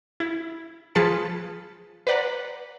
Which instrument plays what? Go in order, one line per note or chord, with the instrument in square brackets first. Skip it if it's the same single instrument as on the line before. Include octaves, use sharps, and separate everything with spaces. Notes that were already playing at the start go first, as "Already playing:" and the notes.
[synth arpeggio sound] E4
F3 F4 G#4 B4 A5 C#7
B4 C5 D5 F#5 A#5